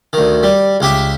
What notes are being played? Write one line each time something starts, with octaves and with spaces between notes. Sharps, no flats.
D2 D#3
G3
C#2 G4 E5